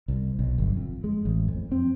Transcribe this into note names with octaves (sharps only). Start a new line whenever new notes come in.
C2
B1
G1
F2
G#3
A1
F2
C4